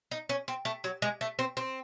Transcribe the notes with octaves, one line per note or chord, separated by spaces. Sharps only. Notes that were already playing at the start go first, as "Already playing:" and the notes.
D#4
C#4
C4
A3
F#3
G#3
A3
C4
C4